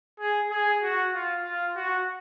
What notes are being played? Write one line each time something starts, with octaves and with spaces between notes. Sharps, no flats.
G#4
G#4
F#4
F4
F4
F#4